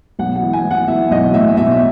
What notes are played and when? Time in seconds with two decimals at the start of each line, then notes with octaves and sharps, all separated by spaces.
0.19 B1 F#5
0.36 F#5
0.42 E3
0.53 G#5
0.65 E3
0.71 F#5
0.88 E3 E5
1.11 B1 D#5
1.34 A2 E5
1.57 B1 E5